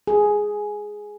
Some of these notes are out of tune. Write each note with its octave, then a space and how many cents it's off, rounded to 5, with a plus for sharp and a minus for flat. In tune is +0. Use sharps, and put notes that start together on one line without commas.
G#4 +5